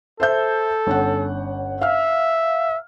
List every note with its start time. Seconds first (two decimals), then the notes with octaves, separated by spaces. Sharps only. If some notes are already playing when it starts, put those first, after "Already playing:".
0.20 A4 C5 E5 G6
0.87 G1 C#4 F#5
1.81 E5 F5 F6